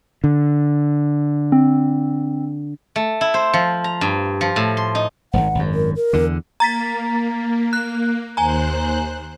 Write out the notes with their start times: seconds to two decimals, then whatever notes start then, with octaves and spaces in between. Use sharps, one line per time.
0.24 D3
1.52 C4
2.96 A3
3.21 E4
3.34 C5
3.53 F3
3.84 A#5
4.01 G2
4.41 F3
4.56 A2
4.77 C6
4.95 D#4
5.33 D#1 G#1 F#5
5.55 G#1 F#2
5.74 A#4
5.96 A#4
6.13 E2 D3
6.60 A#3 A#5 A6 B6
7.73 F#6
8.37 D#2 C5 G#5 A#5 F#6